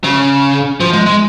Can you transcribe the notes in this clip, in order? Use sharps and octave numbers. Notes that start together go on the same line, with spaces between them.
C#3
F3
G#3
G#3